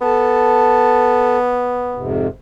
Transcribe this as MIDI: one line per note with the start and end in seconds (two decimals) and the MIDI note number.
0.02 2.16 59
0.02 1.37 69
0.02 1.37 81
1.95 2.28 41
1.95 2.28 44
1.95 2.28 48